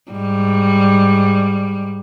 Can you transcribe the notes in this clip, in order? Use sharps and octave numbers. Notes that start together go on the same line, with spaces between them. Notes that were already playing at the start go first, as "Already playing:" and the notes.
G#2 G3